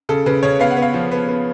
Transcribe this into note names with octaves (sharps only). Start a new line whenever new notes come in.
C#3 A4
C#3 B4
C#3 C#5
B3 F5
F#5
B3
F5
F3
B3
B3